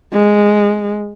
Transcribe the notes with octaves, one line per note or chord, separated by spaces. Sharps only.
G#3